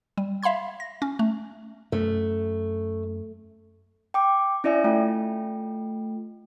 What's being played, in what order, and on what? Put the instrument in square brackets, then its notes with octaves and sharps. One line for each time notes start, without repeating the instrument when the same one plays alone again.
[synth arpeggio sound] G3
E5 F5 B5 C6 G#6
A#6
C#4
A3
[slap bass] F#2 [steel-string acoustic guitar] A3
[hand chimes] G5 D6
C#4 E4 D5 E5 G#5
A3 F4 G5